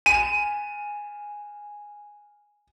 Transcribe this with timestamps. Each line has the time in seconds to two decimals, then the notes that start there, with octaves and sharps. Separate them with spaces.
0.06 G#5 D#7